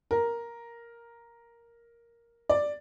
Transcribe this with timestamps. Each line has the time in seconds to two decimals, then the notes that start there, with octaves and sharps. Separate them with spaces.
0.11 A#4
2.50 D5